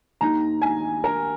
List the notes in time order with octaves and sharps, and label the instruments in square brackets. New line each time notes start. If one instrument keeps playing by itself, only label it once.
[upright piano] D#2 D#3 A#5
G#5
A#4